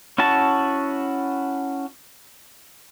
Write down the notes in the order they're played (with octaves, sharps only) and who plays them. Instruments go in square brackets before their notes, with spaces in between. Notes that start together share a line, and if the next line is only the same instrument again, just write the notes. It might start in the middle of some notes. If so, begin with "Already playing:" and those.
[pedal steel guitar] C#4 E4 F#4 A5